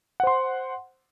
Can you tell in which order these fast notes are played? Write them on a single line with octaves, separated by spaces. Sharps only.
F#5 C5 C6